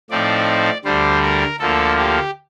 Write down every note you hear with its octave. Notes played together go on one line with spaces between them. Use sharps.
A2 F3 C4 D#4 D5
D2 D3 G3 C5
A#4
D2 D3 F3 A#3 A4
G4